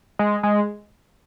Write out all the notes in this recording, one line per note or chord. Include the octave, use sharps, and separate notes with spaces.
G#3
G#3